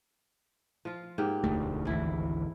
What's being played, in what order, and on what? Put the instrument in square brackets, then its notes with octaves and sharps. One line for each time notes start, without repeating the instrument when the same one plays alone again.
[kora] F3 F4
G#2 A#3 G4
[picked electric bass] E1 D2 A3
[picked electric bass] G#1 D2 E3 [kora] E4